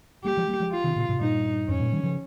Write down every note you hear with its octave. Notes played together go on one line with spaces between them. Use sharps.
G3 A#3 G4
F3 G#3
G3 A#3
F3 G#3
F4
C3 D#3
A#2 C#3
G#2 C3
G2 A#2 D#4
F2 G#2 C#4
G2 A#2
D#3 G3
C#3 F3